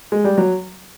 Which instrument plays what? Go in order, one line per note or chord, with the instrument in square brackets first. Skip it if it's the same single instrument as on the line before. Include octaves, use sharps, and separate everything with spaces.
[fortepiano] G#3
G3
F#3